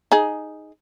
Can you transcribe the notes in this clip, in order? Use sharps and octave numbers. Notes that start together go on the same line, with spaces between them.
D#4 G#4